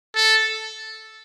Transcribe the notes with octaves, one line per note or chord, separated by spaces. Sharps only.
A4